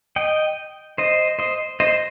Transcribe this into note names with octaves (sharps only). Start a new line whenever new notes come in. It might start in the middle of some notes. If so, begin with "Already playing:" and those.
D#5 G5
C5 D#5
C5 D#5
C5 D#5